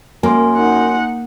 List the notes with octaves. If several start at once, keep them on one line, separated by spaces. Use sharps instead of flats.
F#2 A#3 G#5 C6
D#4 F#5